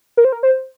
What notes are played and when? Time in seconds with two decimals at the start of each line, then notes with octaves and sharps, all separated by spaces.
0.17 A#4
0.25 C5
0.32 A#4
0.43 C5